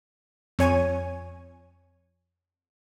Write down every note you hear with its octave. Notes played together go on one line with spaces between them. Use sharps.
F2 C#5 G#5 D#7